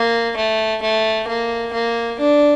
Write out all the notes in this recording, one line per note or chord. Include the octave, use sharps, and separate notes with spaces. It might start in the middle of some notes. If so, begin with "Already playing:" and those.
Already playing: A#3
A3
A3
A#3
A#3
D4